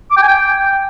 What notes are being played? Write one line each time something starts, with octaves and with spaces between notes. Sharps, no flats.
D6
G5
G#5
G5